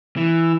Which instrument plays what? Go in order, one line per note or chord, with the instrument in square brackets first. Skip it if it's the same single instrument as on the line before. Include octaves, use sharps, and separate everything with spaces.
[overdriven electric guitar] E3